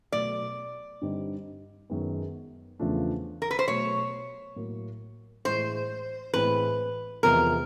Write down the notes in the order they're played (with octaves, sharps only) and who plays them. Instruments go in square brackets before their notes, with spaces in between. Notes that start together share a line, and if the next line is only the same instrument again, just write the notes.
[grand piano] B2 F#3 A3 [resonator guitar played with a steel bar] D5
[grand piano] G2 D3 G3 C4 D#4
F#2 D#3 G#3 B3
E2 C#3 F3 A3 D4
[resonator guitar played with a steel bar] A#4
B4
C5
[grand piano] B2 F#3 A3 [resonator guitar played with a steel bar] C#5
[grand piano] A2 F#3 A#3
[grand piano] A2 E3 G#3 [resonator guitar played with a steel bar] C5
[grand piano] A2 E3 G#3 C4 [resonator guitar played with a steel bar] B4
[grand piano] E2 C3 F3 G#3 B3 [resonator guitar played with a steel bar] A#4